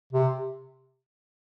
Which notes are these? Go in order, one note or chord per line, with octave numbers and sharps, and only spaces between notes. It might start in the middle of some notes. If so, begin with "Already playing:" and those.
C3